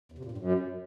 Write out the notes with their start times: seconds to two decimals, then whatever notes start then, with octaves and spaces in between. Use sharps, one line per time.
0.12 E2
0.18 C3
0.25 A#2
0.31 G2
0.38 F#2